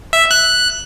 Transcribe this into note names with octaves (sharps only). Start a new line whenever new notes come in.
E5
F#6